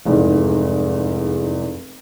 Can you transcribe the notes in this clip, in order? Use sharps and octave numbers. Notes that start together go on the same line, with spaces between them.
F1 E2 G#2